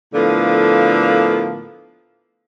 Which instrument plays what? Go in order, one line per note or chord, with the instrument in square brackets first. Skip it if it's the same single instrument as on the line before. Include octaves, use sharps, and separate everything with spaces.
[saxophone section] A2 D3 F3 A#3 B3